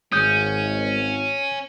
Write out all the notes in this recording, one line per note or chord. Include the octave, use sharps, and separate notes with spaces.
G#1 G#3 C#4 D#6 G6